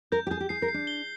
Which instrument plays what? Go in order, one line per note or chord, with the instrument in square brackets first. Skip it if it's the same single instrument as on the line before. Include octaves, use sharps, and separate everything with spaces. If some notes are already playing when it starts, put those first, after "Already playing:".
[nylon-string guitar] A#4 [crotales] G6
[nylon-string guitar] G4
[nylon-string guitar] G#4 [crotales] G6
[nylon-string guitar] G4
[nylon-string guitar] G#4 [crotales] C7
[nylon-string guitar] A#4
[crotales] C7
[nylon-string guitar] D4
[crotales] G7